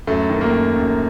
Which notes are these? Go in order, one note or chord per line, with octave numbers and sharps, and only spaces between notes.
F#2 A3
D#3
A#3
F#2
F#2